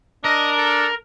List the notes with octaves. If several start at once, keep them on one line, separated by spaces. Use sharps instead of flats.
D4 A#4 D#5
A4